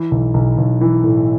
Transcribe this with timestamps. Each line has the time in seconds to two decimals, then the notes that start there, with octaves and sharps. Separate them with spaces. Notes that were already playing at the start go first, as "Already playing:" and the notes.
Already playing: E3
0.11 B1
0.34 B1
0.58 B1
0.81 E3
1.04 A2